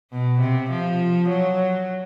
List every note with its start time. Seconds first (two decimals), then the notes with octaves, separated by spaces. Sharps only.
0.12 B2
0.41 C3
0.70 F3
1.29 F#3